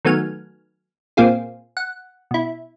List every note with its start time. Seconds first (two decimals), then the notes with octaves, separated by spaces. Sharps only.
0.05 D#3 F#3 A3 B3 G#5 F6
1.17 A#2 A#3 C4 F4 G#4
1.77 F#5
2.31 B2 E4